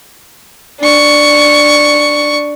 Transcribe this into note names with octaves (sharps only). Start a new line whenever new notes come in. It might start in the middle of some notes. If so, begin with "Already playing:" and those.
D4 C#6